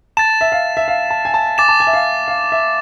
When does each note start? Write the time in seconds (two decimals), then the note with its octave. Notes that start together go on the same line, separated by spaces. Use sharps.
0.17 A5 A6 E7
0.41 E5
0.52 F5
0.77 E5
0.88 F5
1.10 A5
1.25 G#5
1.34 A5
1.58 G#5 D6 A6 E7
1.69 A5
1.80 G#5
1.87 E5
1.93 F5
2.28 F5
2.52 E5